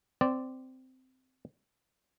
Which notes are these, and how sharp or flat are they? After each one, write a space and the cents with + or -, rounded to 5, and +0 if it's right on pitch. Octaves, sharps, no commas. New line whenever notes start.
C4 -15 D5 +0